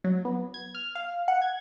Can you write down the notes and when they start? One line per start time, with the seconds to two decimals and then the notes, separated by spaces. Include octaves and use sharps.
0.04 F#3
0.25 B3
0.54 G#6
0.75 F6
0.95 F5
1.28 F#5
1.42 G#6